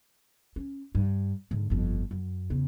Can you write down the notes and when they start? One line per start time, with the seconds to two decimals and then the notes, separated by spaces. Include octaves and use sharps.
0.56 C#4
0.95 G2
1.51 G#2 D3
1.70 G1 F2
2.11 F#2
2.50 E2 C#3